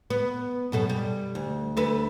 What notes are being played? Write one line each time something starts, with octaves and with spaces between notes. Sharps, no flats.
B3
F#2 B2 A4
G3
D2
D2 A4 B4